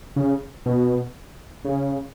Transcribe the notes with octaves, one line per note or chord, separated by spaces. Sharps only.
C#3
B2
C#3